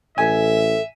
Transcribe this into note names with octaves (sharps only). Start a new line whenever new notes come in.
A1 A4 E5 G#5